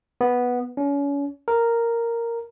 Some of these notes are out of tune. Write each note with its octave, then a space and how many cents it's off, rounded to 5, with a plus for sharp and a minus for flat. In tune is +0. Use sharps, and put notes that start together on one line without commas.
B3 -5
C#4 +35
A#4 -5